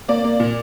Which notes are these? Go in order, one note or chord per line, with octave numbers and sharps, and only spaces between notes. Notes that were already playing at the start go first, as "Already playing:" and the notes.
A#3 D5
A#3
A#2